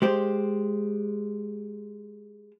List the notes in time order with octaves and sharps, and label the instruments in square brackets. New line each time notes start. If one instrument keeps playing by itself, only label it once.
[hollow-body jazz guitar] G#3 G4 C5